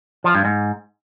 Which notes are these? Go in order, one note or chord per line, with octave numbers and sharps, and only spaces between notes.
F3
G2
G#2